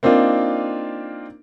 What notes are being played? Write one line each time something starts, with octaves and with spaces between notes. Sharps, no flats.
A#3 C4 D4 D#4 F4